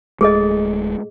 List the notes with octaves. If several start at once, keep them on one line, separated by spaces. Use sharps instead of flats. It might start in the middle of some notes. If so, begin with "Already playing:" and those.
D1 G#3 A3 G#4 A4 D#5